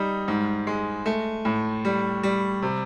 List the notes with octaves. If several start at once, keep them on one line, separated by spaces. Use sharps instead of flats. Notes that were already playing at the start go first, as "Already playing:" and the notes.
Already playing: G3 D#4
G#2
G#3
A3
A2
G3
G3
C3